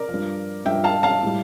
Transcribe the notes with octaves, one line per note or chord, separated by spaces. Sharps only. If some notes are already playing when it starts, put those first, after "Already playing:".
Already playing: A#4 D5
G2 F3
G2 F3 E5 G5
F5 A5
F5 A5
A2 G3